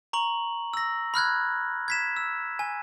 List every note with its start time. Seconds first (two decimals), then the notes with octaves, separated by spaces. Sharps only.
0.13 A#5 C#6 F#7
0.74 E6 A#6
1.14 B5 F6 F#6 G#6
1.88 G#6 B6 E7
2.17 E6
2.59 G#5